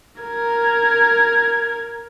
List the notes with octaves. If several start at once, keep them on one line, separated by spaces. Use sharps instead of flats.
A#4 G#6